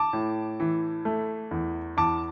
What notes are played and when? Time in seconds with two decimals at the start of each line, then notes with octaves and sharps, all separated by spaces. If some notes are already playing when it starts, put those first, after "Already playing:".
Already playing: A5 D6
0.13 A2
0.60 E3
1.05 A3
1.51 E2
1.97 E2 A5 D6